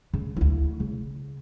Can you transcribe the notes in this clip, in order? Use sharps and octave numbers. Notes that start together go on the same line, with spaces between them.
C#3
D2 E4
C#3